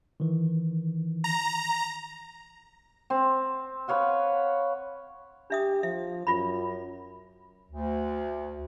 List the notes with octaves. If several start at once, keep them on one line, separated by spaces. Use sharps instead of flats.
D#3 E3
A#5
C4
B4 C#5 F5 F#5
D4 G4 E5 D#6
F3 E5
F#2 F4 B5
D2